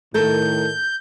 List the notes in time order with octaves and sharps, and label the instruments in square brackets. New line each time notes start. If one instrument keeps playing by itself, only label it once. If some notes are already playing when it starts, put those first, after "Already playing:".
[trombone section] A2 D#3 [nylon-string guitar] A4 A#4 [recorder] G6